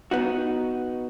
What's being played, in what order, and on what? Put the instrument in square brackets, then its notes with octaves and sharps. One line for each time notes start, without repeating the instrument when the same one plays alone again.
[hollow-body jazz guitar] B3 D#4 F#4